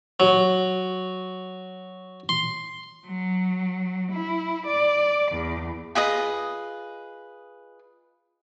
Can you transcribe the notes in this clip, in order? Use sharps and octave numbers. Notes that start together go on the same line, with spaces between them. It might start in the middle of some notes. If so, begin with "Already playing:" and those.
F#3
C6
F#3
E4
D5
E2
F4 G#4 B4 D#5